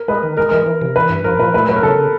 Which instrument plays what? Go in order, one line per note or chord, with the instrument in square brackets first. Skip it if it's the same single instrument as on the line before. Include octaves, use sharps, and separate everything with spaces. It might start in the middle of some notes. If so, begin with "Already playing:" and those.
Already playing: [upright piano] A#4
[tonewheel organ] G#3 [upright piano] B4
[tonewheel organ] D#3
[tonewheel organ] G#3 [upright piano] A#4
[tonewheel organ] E3 [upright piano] A#4
[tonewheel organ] E3
C3
[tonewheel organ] E3 [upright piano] B4
[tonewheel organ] G2
[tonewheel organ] F3 [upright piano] A#4
[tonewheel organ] A#2 [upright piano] B4
[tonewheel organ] A3 [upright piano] B4
[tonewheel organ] F#3 [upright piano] B4
[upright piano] A#4
[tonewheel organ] C#3 [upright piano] A4